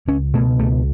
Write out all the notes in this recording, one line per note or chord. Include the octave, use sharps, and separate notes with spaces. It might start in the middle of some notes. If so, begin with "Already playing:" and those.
C#2 C#4
B2 A3
C#2 A3